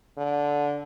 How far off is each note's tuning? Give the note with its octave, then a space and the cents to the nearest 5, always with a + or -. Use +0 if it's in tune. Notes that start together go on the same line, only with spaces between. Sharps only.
D3 -15